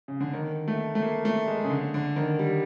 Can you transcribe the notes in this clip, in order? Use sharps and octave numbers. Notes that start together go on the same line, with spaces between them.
C#3
D3
D#3
A3
A3
A#3
A3
G#3
C#3
D3
D3
D#3
G3